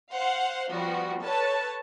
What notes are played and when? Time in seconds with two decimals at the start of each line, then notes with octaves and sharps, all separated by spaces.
0.13 C5 F5 F#5
0.71 F3 G3 B3 F#4
1.22 A4 B4 C#5 A5